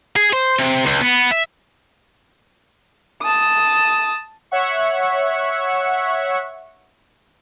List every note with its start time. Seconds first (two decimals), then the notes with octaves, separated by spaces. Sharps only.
0.16 G#4
0.33 C5
0.59 C3
0.86 C#2
1.01 B3
1.31 E5
3.22 A5 D#6
4.51 C#5 E5 F#5 C#6